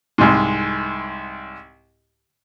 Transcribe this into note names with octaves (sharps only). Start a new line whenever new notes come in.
C2 G#2